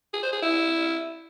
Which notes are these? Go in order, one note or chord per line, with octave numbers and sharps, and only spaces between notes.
G#4
C5
G#4
E4